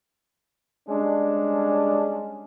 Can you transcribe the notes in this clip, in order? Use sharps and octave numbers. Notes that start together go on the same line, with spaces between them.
G3 G#3 C#4 D4